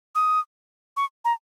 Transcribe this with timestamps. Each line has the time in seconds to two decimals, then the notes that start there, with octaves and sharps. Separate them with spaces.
0.15 D#6
0.97 C#6
1.25 A#5